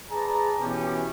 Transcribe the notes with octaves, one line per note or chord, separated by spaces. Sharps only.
G#4 B4 D5 A5 A#5
B2 E3 B3 C#4 G4